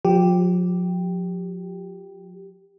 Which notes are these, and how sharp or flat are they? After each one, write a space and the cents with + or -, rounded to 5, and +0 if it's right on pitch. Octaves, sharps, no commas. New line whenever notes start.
F3 +40 G4 +0